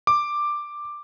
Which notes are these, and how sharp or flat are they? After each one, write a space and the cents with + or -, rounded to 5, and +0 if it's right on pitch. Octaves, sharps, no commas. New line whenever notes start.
D6 +5